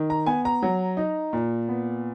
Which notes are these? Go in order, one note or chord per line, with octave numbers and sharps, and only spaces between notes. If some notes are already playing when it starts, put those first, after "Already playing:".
Already playing: D#3
A#5
B3 G#5
A#5
F#3
D#4
A#2
B3